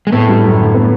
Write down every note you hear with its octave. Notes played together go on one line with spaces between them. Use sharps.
G#3
A2 A3 B3
G3
F#2
D3
B3